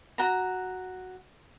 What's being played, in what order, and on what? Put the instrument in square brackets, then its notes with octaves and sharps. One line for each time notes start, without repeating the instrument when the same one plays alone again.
[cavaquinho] F#4 A#5